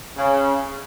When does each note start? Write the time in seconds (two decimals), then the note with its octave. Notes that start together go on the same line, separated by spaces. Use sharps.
0.17 C#3